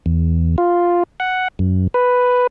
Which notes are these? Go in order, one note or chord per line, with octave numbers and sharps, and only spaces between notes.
E2
F4
F#5
F#2
B4